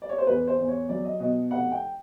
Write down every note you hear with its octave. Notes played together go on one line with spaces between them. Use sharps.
D5
C#5
C5
E2 B4
C5
E2
C#5
F#3 D5
D#5
B2 D#5
F1 F#5
G5